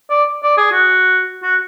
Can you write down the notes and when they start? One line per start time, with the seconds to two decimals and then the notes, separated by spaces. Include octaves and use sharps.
0.10 D5
0.43 D5
0.57 G#4
0.72 F#4
1.43 F#4